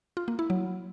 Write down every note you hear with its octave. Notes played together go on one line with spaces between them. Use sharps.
F4
A#3
E4
F#3